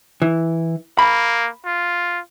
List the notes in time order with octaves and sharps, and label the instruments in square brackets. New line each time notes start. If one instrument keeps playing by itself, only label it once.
[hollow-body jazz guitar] E3
[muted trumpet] A#3 [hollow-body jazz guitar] B5
[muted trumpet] F4